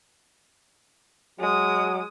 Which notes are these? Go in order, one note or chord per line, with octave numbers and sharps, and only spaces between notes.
F#3 G#3 D#6